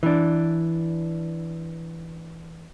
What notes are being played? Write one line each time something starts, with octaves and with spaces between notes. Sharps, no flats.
E3 D4